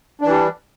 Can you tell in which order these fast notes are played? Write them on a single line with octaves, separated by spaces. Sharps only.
D4 E3 G3